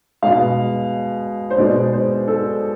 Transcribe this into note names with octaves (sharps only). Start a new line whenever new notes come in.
B2 G#3 F5
C5
B2 G#3 D5
C5
A4